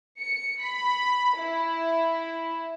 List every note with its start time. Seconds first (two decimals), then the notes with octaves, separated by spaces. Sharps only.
0.19 C#7
0.60 B5
1.39 E4